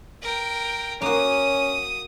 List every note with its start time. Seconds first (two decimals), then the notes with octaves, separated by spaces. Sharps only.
0.22 A#4 G5
1.02 A#3 C#4 F#4 D#6